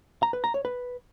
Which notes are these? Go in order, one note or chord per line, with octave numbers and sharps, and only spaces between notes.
A#5
B4
A#5
C#5
B4